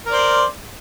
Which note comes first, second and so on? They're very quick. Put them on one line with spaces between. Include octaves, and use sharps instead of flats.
A#4 D5 C5